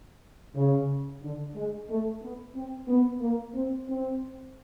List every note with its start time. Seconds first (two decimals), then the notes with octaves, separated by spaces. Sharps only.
0.56 C#3
1.22 D3
1.56 G#3
1.89 A3
2.22 B3
2.55 C4
2.89 B3
3.21 A#3
3.54 C4
3.89 C4